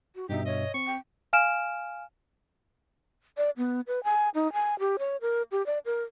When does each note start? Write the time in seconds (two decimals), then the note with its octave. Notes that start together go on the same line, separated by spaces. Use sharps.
0.15 F#4
0.29 G2 B2 D#4 G4 E5
0.46 C#5 D#5
0.74 C4 C#6
0.87 G5
1.33 F5 G#5 F6 D7 E7
3.37 D5
3.57 B3
3.87 B4
4.04 G#5
4.35 D#4
4.53 G#5
4.79 G4
4.99 C#5
5.21 A#4
5.52 G4
5.66 D5
5.85 A#4